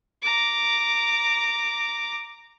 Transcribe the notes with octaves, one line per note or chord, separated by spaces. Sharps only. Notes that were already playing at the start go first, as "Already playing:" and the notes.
A#5 D6